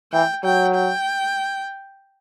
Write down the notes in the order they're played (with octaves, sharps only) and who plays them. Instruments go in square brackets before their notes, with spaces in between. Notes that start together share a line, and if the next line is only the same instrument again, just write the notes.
[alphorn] E3 [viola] G5
[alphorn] F#3 [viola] G5
[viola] G5